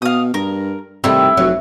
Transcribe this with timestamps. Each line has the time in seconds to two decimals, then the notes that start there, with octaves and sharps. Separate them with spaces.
0.02 B2 F5 D#6
0.34 G2 A#4
1.04 C3 D#3 G3 A3 E4
1.37 F1 F#3